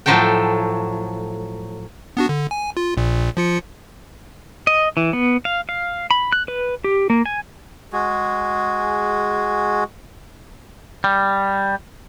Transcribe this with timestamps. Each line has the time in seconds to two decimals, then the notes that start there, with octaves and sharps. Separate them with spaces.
0.06 A2 F3 F#3 A4 G5
2.17 B3 D4 F#4
2.29 D3
2.51 G#5
2.77 F4
2.97 A#1 A#2
3.37 F3 F4 C#7
4.67 D#5
4.97 E3
5.13 B3
5.45 F5
5.69 F5
6.11 B5
6.32 F#6
6.48 B4
6.84 G4
7.10 A#3
7.26 G#5
7.93 G#3 F#4 G#4
11.04 G3